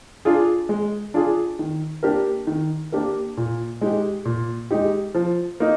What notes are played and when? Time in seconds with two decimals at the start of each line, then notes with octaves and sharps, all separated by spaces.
0.25 D4 F4 G#4
0.69 G#3
1.14 D4 F4 G#4
1.59 D#3
2.03 A#3 D4 G4 A#4
2.47 D#3
2.92 A#3 D4 G4 A#4
3.37 A#2
3.81 G#3 D#4 G4
4.25 A#2
4.71 G#3 D#4 G4
5.15 F3
5.60 A#3 D#4